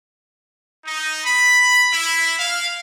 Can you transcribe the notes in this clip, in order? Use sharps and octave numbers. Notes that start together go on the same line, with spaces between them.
D#4
B5
E4
F5